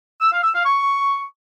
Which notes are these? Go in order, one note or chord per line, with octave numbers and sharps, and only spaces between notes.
E6
F5
E6
F5
C#6